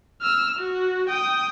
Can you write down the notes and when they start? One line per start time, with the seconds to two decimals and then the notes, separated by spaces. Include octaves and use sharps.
0.22 E6 F6
0.59 F#4
1.09 G5 D#6